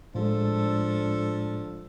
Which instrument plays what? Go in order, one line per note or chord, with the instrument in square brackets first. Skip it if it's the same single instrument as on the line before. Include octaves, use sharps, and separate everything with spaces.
[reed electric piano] A2 G#3 [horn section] F3 D4 A4